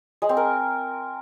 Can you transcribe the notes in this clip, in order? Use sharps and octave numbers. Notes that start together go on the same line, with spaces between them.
G#3
C4
A#4